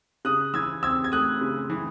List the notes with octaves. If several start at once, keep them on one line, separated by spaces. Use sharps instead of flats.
C#3 D#6 F#6
E3 E6 G#6
C4 E6 G#6
G#6
A3 D#6 F#6
C#3
E3